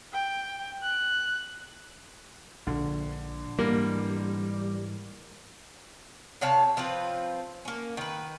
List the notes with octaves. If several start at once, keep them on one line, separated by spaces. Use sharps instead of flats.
G5
F#6
A#1 D3
G#2 E3 G3 A#3
C3 C#5 F5 A5
F3 C4 F4 B4
A#3 C#4
D#3 B4